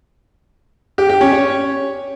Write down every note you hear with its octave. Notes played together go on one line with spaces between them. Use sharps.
G4
G4
C#4
C#5